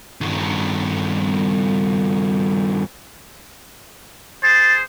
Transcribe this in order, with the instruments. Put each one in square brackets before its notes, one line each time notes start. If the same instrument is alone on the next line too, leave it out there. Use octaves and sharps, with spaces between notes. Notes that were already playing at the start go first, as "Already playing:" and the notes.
[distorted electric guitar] G2 D#3
[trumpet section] G#4 C5 [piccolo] A6